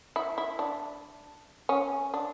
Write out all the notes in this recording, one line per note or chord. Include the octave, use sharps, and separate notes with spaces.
E4
E4
D4
C#4
D4